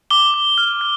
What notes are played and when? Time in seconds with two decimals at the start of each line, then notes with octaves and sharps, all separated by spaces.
0.10 D6 G7
0.34 D6
0.58 F6
0.81 F6